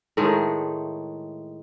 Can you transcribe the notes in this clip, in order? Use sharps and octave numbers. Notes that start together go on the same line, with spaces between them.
A2 D#3 G#3 A3